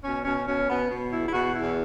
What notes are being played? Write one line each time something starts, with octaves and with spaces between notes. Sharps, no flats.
B2 C#4
B2 C#4
B2 C#4
B2 B3
B2
E2 E4
E4
B2 F#4
E2 E4